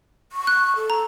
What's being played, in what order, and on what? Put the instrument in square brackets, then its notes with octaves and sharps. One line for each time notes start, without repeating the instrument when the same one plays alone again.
[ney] C#6
[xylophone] F#6
[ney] A4
[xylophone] A#5